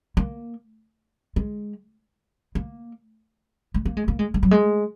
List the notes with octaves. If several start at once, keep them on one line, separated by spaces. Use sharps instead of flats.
A#3
G#3
A#3
G#3
A#3
G#3
A#3
G#3
G#3
F#3
G#3